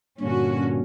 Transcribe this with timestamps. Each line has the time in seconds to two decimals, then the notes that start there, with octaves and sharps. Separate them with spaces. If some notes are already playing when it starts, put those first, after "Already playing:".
0.21 G2 A#2 D3 C#4 F#4